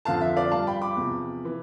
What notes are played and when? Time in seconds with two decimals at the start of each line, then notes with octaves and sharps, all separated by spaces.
0.05 F2 D3 F3 F5 A5
0.21 E5
0.36 D5 F5
0.51 G2 F3 F5 A5
0.67 G5 B5
0.81 B5 D6
0.96 E2 C3 F3
1.45 E3